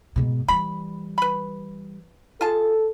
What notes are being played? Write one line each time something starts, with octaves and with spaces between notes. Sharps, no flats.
G#2 B2
E3 G3 B5
B4 B5
F4 G#4 A4 A5